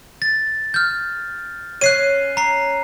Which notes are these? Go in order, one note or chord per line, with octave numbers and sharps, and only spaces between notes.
A6
F6 G6
C#4 F#6 C7 D#7
A#5 C7